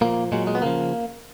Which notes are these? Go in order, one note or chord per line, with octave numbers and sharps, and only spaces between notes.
A#2 F3 A#3
A#2 F#3 G#3
G#3
B3
C#3 F3 A#3